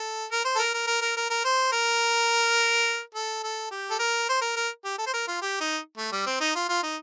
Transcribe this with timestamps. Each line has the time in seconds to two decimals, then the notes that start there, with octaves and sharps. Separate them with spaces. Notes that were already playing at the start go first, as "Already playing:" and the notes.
Already playing: A4
0.32 A#4
0.45 C5
0.56 A4
0.59 A#4
0.74 A#4
0.87 A#4
1.01 A#4
1.17 A#4
1.30 A#4
1.44 C5
1.72 A#4
3.15 A4
3.43 A4
3.71 G4
3.90 A4
3.99 A#4
4.28 C5
4.41 A#4
4.56 A#4
4.84 G4
4.98 A4
5.06 C5
5.13 A#4
5.27 F4
5.42 G4
5.60 D#4
5.97 A3
6.12 G3
6.26 C4
6.41 D#4
6.55 F4
6.69 F4
6.83 D#4